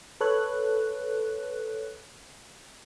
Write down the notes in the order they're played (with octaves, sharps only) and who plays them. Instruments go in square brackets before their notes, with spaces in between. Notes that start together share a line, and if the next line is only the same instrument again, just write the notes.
[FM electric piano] A4 B4 C#5 F#6